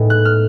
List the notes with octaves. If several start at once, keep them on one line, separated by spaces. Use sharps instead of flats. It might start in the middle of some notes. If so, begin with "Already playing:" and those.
Already playing: A2 G#3 B3 D#4
F#6
F6